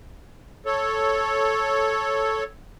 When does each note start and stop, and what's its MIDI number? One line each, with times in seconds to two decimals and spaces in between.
0.66 2.44 69
0.66 2.44 73